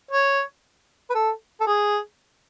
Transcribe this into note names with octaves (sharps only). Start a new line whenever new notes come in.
C#5
B4
A4
A4
G#4